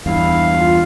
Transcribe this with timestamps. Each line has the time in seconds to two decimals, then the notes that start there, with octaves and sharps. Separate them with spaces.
0.06 E2 G2 E4 F5
0.56 F4